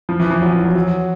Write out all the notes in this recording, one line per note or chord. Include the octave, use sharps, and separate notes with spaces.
F3
E3
F3
F#3
E3
F#3
F#3